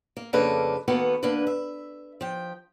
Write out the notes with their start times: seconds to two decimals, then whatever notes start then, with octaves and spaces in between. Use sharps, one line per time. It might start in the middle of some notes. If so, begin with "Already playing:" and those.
0.17 A#3
0.33 F2 C#3 A#3 D4 A4 B4
0.88 D#3 A#3 B3 F#4 A4 B4
1.23 D3 A#3 D4 B4
1.47 E5
2.21 F3 G5